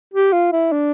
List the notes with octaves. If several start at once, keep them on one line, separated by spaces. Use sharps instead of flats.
G4
F4
E4
D4